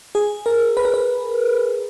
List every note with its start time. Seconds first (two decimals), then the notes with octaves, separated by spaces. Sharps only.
0.15 G#4
0.46 A#4
0.77 B4
0.85 A#4
0.94 B4